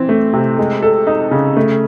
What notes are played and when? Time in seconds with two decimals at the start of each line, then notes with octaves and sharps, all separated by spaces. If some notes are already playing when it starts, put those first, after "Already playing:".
Already playing: E3 C4
0.09 A3
0.33 C3
0.59 G#3
0.82 A4
1.07 D#4
1.31 C#3
1.57 A3